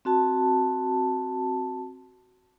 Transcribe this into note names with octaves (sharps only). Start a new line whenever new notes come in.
C4 F#4 A5